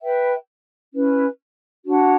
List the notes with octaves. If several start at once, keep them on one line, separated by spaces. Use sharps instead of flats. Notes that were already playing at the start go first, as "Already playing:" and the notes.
B4 E5 G5
C#4 E4 B4
D4 F#4 C#5 F#5